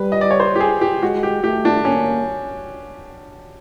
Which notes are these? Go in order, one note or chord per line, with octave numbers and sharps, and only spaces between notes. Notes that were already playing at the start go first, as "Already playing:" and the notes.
Already playing: G3 B4
D#5
D5
C#5
C5
G4
G#4
G4
G#3 F#4
G4
A3 G4
D4
A#3 C#4